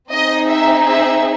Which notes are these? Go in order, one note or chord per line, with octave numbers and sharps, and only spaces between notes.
C4 D#4 G#4 D#5
E5
E5